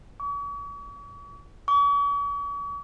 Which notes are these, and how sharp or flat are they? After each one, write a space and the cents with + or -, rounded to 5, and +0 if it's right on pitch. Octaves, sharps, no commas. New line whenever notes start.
C#6 +45
C#6 +45